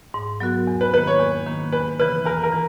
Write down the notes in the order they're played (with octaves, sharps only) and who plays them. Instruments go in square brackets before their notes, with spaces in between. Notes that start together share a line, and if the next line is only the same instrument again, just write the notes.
[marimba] G#2
F#3 B3 F#4 A#4
E2
[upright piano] B4
[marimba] D#3 A#3 [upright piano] B4
[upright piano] C#5
[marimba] E2
D#3 A#3
[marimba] E2 [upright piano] B4
[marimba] C#3 E3 [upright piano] B4
[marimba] E2 [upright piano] A#4
[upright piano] A#4
[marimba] E3